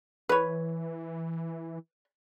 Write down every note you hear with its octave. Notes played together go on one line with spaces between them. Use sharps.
E3 B4 C#5